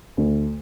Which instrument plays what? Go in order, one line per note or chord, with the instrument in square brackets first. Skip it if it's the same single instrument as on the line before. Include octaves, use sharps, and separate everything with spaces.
[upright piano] D2